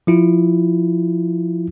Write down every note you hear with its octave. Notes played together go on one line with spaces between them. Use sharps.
F3 E4 F4